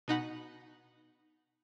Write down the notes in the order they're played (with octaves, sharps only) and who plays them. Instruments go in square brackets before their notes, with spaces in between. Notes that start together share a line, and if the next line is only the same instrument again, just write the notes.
[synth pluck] B2 D#4 F#5 B5